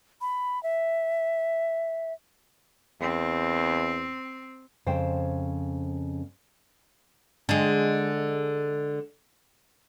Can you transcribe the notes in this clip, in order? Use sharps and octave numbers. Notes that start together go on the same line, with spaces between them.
B5
E5
E2 C4
F2 C#3 C5 G5
D3 G#3